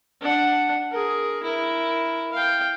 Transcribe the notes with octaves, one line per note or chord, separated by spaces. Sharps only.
D4 F#5
G#4 A#4
E4 A#4
F5 G5